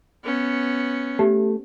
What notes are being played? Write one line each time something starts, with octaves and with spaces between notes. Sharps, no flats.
B3 C#4
A3 G4